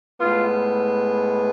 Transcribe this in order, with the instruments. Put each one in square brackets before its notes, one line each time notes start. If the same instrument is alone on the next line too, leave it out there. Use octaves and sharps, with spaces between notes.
[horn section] A2 G#3 B3 F4